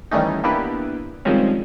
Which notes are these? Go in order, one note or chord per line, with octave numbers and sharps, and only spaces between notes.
D#3 E3 G3 A3 C#4 D#4
A#3 B3 D4 E4 G4 B4
D#3 F3 G3 G#3 C4 C#4